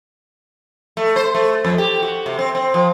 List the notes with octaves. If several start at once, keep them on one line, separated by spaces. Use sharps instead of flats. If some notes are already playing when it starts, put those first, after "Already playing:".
A3
C5
A3
F2
G4
F#4
C3
C4
C4
F3